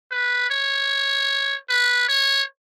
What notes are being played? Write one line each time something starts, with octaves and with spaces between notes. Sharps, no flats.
B4
C#5
B4
C#5